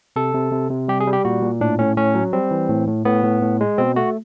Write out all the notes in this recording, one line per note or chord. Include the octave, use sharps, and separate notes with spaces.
C3 A4
C3
C3
C3
G3 G4
G#4
G3
G4
A#2 F#4
A#2
A2 D4
A2 C#4
A2 C#4
F#3
G3 C4
E3
A2
A2
A2 B3
A2
A2
G#3
B2 C4
A3 F#4